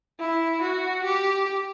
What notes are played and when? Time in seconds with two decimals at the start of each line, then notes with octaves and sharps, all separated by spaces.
0.20 E4
0.62 F#4
1.05 G4